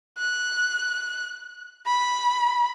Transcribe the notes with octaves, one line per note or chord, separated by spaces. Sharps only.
F#6
B5